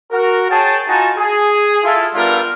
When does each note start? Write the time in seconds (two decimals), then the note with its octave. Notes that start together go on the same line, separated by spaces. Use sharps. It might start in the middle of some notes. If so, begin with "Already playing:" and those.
0.11 F#4 A#4
0.50 G#4 C#5 G5 A5
0.87 D#4 F4 F#4 G#5 A5
1.17 G#4
1.84 E4 F4 A4
2.15 G3 B3 D4 F4 A4 A#4